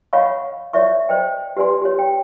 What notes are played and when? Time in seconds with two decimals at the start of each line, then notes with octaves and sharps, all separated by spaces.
0.13 C#5 D#5 F5 F#5 B5 C#6
0.73 C#5 D5 E5 C#6
1.09 C5 D5 D#5 G5
1.57 G4 B4 D5 G#5 C6
1.82 G4 C#5
1.99 G5